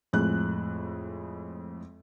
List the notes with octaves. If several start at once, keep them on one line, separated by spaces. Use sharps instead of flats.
F2 A2 G#3 F#6